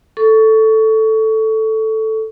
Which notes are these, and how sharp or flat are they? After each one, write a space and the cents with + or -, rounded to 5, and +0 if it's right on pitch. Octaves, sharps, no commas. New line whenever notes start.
A4 +0 C#6 +20